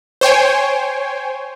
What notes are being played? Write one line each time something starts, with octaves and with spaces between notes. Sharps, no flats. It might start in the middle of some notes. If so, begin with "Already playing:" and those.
C5 C#5 G5 G#5